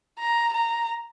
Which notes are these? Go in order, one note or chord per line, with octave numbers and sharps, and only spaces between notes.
A#5
A#5